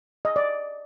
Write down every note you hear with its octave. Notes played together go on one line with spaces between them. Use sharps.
D#5
D5